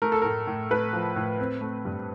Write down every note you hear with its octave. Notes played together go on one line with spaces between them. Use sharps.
A3 A#4
A4
A2 A#4
A2
A3 B4
F3
A2
C4
A3
G2